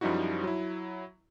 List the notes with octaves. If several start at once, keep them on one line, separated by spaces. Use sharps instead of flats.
F#2 F3 G3 D#4 E4 F#4
F#3 E4